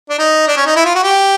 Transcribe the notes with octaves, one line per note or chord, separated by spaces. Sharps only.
D4
D#4
D4
C#4
D#4
E4
F4
F#4
G4